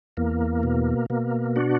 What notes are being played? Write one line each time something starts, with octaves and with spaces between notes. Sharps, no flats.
E2 A#3
B2
B2 A#3
D4 F#4